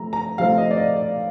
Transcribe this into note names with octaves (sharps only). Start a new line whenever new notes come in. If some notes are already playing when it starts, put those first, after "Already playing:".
Already playing: C3 F3 A3 A#5
A#5
C3 F3 A3 C4 F5
D#5
D5
D#5
D5